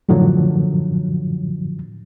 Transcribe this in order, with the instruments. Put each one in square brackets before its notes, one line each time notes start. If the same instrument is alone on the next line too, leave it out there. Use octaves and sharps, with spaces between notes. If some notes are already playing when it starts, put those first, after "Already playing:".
[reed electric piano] F#2 A2 D3 F3 F#3